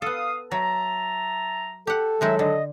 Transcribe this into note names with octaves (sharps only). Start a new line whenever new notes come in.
B3 A4 F5 D#6
F#3 E5 A5 A#5
G4 A4 F#5
D#3 F#3 G#3 D#4 E5
D3 D#5